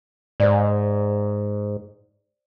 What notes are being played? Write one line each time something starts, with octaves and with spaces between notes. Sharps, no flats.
G#2 C5 D5